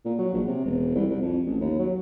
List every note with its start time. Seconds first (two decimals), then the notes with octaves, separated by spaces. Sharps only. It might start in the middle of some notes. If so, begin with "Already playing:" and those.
0.05 A#2
0.18 F#3
0.33 A#1
0.47 C3
0.65 E1
0.95 C2
1.10 C2
1.21 F2
1.46 A1
1.61 D#2
1.79 F#3